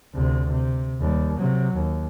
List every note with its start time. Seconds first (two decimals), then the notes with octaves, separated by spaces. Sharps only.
0.14 D2 C3
0.50 C3
1.00 D#2 G3
1.36 C3 F#3
1.75 D#2